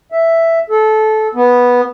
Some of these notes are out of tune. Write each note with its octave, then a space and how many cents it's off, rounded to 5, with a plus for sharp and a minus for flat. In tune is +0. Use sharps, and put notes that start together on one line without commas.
E5 +5
A4 -20
B3 -10